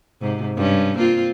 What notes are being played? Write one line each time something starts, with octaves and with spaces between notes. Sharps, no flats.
G#2 C3
G2 C#4
A#3 C4 F4